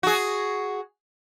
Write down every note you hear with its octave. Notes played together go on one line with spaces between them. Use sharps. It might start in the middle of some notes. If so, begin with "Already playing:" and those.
F#4 G#4